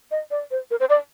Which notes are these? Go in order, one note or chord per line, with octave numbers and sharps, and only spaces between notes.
D#5
D5
C5
A#4
C5
D5